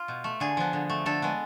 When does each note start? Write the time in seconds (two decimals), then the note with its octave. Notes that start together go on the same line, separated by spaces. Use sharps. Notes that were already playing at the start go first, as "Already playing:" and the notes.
Already playing: F4
0.08 B2
0.24 A3
0.40 D3 G#4
0.57 F3 B3
0.73 D3
0.89 A3
1.06 D3 A4
1.22 G#3 B3